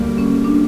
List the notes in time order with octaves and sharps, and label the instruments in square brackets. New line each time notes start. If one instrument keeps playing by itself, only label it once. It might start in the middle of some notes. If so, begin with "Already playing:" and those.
Already playing: [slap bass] D2 D3 G3 A#3
[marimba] C#4
D4